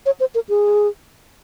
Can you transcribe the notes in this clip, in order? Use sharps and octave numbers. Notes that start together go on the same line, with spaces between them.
C#5
C5
A#4
G#4